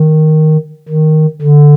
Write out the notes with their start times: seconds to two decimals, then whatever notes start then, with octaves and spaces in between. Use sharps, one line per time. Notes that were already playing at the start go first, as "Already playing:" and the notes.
Already playing: D#3
0.89 D#3
1.42 D3